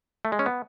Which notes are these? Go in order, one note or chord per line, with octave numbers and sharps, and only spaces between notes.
A3
G#3
C#4
B3